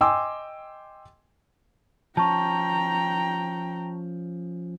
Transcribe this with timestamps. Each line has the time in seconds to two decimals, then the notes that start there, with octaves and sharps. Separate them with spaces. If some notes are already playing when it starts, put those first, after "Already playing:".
0.01 D#5 G5 G#5 C6 D6 E6
2.17 F3 C#4 G5 A5 A#5 C#6